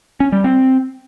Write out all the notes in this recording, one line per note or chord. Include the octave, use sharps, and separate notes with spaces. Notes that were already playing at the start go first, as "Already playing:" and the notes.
C#4
G3
C4